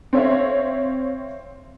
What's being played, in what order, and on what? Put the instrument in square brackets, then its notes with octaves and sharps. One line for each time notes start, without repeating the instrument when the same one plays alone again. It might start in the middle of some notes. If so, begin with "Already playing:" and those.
[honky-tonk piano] C4 C#5 E5 F5